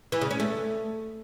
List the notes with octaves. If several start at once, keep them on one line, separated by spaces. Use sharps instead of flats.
E3
C#3
C#4
A3